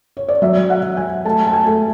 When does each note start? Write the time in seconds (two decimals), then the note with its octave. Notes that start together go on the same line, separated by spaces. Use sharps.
0.17 C#5
0.28 D5
0.42 F#3 E5
0.70 F#5
0.83 F#3
0.97 G#5
1.25 A3 A5
1.47 A5
1.53 G#5
1.67 A3